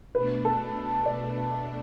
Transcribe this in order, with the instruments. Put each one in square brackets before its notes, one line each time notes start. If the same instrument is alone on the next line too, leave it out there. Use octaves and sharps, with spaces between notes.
[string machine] B2 A3 D4 [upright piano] B4
[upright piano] A4
D5